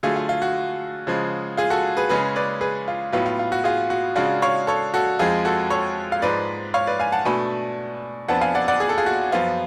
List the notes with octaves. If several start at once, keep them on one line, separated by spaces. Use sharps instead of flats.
D3 F#3 A3 F4 G#4
F4
F4
F#4
C#3 F3 G#3
F4 G#4
F#4 A4
G#4 B4
C#3 G#3 C#4 G#4 B4
B4 D5
G#4 B4
F4
A2 F#3 B3 F4
F4
F4
F#4
F4 G#4
F#4
C#3 G#3 D4 F4 F#4
C#5 F5
A4 C#5
F#4 A4
F2 F3 G#3 F4 G#4
F#4 A4
A4 C#5
F5
G#2 F3 G#3 B4 D5
C#5 F5
B4 D5
F5 G#5
F#5 A5
B2 A3 D4 G#5 B5
F2 F3 B3 D4 F#5 A5
F5 G#5
D5 F#5
D5 F#5
G#4
A4
F4 G#4
F#4
F#2 F3 B3 F4